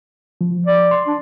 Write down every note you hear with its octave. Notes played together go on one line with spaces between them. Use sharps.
F3
D5
C6
D4